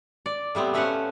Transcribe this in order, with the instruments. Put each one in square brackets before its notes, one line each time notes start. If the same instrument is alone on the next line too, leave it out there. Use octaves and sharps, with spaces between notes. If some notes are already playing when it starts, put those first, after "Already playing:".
[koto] D5
A2 G3 B3 C4
A3 C#4 B4 C5 F5 F#5